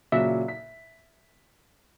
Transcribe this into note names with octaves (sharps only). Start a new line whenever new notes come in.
A#2 C#3 F#3 E5
B6